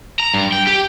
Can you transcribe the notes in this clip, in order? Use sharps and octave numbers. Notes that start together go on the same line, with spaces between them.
A#5
G2
G5
G4